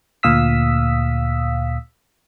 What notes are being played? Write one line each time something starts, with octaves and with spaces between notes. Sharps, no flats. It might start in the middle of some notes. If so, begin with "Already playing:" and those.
D2 A#2 F5 D#6 E6 B6